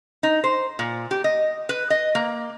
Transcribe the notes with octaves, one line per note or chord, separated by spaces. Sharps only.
D#4
C5
A#2
G4
D#5
B4
D#5
A#3